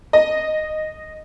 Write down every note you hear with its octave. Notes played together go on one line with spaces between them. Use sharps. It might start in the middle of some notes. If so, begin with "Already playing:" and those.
D#5